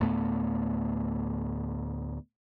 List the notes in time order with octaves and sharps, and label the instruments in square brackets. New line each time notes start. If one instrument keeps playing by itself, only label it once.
[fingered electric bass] D2 A2 A3 B3